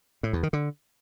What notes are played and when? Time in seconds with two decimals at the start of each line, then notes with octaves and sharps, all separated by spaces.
0.23 A2
0.33 E2
0.43 D#3
0.53 D3